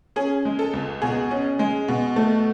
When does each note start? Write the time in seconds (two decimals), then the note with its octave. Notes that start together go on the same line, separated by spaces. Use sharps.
0.16 C#4 G#4
0.45 G#3
0.59 A4
0.73 C#2
1.02 B2 G#4
1.31 C#4
1.59 G#3
1.88 B2
2.16 A3